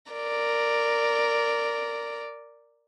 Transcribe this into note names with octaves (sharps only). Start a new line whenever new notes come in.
A#4 D5